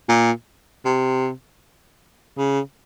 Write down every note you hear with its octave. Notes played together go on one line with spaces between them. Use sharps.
A#2
C3
C#3